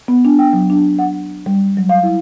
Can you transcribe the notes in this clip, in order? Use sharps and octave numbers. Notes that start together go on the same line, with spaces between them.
B3
D4
G5
F#3
D4
F#5
G3
F#3
F5
E4